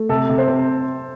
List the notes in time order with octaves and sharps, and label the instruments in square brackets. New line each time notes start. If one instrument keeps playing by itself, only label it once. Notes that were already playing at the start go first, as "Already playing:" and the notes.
Already playing: [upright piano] A3
[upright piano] C3 [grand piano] A4
[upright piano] C3
[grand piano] C5
[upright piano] C4